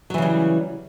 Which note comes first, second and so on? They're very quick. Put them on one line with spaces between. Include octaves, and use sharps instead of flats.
F#3 E3 C#3 G3